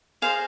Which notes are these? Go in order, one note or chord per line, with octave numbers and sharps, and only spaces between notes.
G#4 C5 D#5 F5